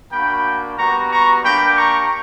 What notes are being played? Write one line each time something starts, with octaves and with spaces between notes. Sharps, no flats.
A#3 D4 F#4 G5 B5
G3 B3 F#4 A#5 C#6
A#5 C#6
A#3 D4 G4 G5 B5
A#5 C#6